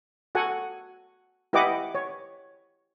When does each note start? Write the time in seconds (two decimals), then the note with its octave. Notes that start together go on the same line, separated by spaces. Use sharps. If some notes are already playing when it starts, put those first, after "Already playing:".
0.35 F#4 A4 F#5 G#5
1.53 E4 G4 B4 D#5 F#5 D6
1.95 C#5